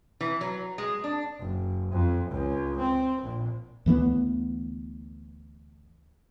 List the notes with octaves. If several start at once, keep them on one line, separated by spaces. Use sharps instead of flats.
E3
F#3
G#3
D4
F#1
F2
C#2
C4
A#1
D2 E3 A3 B3